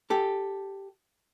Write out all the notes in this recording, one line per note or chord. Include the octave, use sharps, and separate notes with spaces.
G4 A4